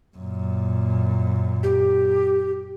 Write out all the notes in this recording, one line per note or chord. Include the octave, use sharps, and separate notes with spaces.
F#2 A#2
G4